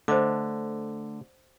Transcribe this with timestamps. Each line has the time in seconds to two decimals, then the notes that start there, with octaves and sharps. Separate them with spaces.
0.08 D3 A3 C5 D#5 D6